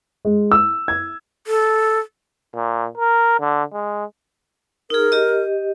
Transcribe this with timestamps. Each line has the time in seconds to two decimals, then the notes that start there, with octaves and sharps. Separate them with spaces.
0.25 G#3
0.52 E6
0.88 G#6
1.47 A4
2.55 A#2
2.97 A#4
3.40 D3
3.73 G#3
4.90 D#4 G#4 A#4
5.12 G4 D#5